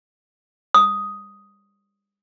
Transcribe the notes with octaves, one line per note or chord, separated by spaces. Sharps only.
D#6